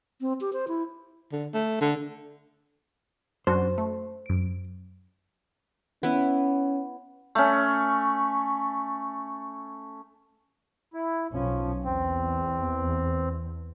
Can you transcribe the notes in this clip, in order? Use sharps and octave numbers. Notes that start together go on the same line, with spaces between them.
C4
G4
C5
E4
D3
A3
D3
F#2 D4 F#4 C5
A3
F#2 D7
B3 C#4 E4 B4
A3 C#4
E4
B1 F3 C#4
E2 C4